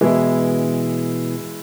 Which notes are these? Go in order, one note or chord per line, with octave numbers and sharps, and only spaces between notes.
B2 E3 G#3 E4